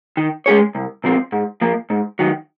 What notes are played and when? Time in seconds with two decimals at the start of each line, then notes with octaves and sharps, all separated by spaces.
0.17 D#3
0.46 G#3 C#4 G#4 C#5
0.75 C2
1.04 A#2 F3 C4
1.32 G#2
1.61 F3 A#3
1.90 G#2
2.19 D#3 F#3